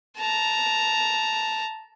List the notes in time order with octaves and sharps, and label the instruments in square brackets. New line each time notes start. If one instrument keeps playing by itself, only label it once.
[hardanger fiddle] A5 A#5